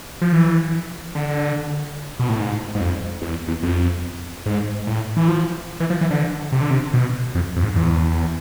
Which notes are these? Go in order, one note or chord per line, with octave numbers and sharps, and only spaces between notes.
F3
E3
D3
B2
A2
G#2
G#2
F2
E2
E2
F2
G#2
A2
E3
F3
E3
F3
E3
D3
C3
D3
C3
B2
F2
F2
G#2
E2